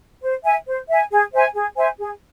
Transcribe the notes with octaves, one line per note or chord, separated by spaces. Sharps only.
C5
E5 G#5
C5
E5 G#5
G#4
C5 E5 G#5
G#4
C5 E5 G#5
G#4